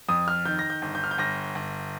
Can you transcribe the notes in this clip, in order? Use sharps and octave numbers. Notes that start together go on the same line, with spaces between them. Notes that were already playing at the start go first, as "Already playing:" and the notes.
F2 D#6
F6
D#3 G6
A#6
G6
G1
G6
F6
G6
G1 A#6
G1